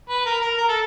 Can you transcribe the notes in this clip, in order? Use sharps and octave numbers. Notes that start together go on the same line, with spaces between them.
B4
A#4
A#4
A#4
A4